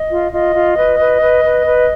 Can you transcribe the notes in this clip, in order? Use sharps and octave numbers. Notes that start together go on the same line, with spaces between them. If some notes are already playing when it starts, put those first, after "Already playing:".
Already playing: D#5
F4
F4 D#5
F4
B4
B4
B4
B4
B4